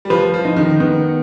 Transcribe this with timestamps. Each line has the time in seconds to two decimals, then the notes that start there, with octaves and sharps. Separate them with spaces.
0.05 G3
0.10 F3 B4
0.34 F3
0.45 D#4
0.57 D#3
0.80 D#3 B3